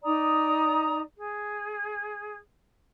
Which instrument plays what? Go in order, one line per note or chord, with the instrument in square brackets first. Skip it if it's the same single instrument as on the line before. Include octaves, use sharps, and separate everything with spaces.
[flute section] D#4 D5 A#5 D#6
G#4